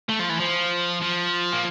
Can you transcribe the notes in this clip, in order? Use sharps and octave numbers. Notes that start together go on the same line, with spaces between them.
A3
F3
E3
F3
F3
A#3